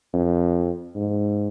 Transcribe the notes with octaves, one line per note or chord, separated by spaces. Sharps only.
F2
G#2